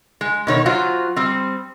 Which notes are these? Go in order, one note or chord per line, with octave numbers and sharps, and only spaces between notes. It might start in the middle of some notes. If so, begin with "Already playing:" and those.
G#3
B2 D#3 C#5
F#3 F4 F#4 C5
G3 C4